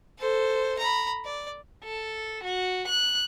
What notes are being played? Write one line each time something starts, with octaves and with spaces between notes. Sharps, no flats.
A4 C5
A#5 B5
D5
A4
F#4
F#6